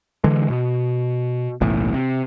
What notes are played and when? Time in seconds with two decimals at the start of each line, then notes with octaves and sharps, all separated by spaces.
0.24 D3 E3 G#3
0.50 B2
1.61 F#1 B1 A2 E3
1.94 C3